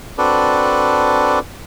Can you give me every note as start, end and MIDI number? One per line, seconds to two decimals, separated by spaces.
0.18 1.39 60
0.18 1.39 62
0.18 1.39 66
0.18 1.39 69
0.18 1.39 71
0.18 1.39 74